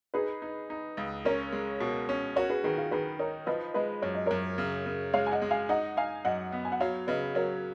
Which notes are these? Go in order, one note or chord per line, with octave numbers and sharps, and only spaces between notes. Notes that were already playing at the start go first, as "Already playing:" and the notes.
D#4 G#4 B4
D#4
D#4
C#2
C#4 A#4 C#5
G#3
B2
C#4
F#4 A#4 C#5
G#4 B4
D#3 G#4 B4
F4 G#4
D#3 G#4 B4
D#4 A#4 C#5
F3 B4 D#5
G#3 B4 D#5
F#2 C#5
D#5
F#2 A#4 C#5
C#3
C#3
G#3 C#5 F5
G#5
D#5 F#5
G#3
F5 G#5
D#4 D#5 F#5
D#4 F5 G#5
F#2 D#5 F#5
B3
G#5
F#5
F#3 C#5 F5
C#3 B4 D#5
F#3 A#4 C#5